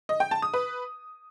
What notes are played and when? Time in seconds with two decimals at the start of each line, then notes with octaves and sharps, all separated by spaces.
0.09 D#5
0.20 G5
0.31 A5
0.42 D#6
0.54 B4